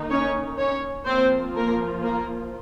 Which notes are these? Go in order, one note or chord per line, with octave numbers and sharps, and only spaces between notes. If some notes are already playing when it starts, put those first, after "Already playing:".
Already playing: D#3 A#3 D#4
C#4 C#5
C#4 C#5
F3 A#3 C4 F4 C5
A#3 A#4
A#3 A#4